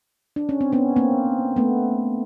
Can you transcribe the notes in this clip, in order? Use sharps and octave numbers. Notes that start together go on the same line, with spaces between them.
D4
C#4
C4
B3 C#4
A#3 C4
A3 B3